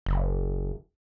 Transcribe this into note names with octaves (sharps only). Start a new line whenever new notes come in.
F#1